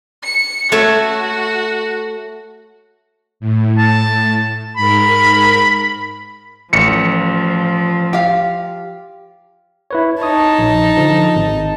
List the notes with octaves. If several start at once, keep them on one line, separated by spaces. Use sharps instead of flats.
C#7
A3 F#4 C#5 E5
A2
A5
G#2 A#4 B5
A1 F3 C#7
G4 F5
E4 B4 C#5
D#4 C#5 A5 D#6
A#1
D3 F3
G#1